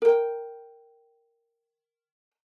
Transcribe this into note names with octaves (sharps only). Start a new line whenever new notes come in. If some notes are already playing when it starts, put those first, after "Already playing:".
A#4 G5